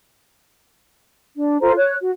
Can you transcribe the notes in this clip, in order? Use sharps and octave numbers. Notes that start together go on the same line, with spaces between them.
D4
F4 A4 C5 A#5
C#5 F#6
F#4